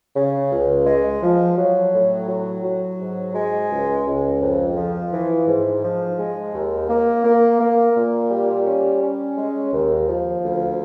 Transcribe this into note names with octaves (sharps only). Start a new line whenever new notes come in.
C#3
C#2
G#3
F3
F#3
A2
F#3
F#3
G#2
G#3
C#2
C#2
F2
F3
E3
G#2
F3
G#3
D#2
A#3
A#3
A#3
A#2
G3
C#4
C#4
G#3
D#2
F3
D2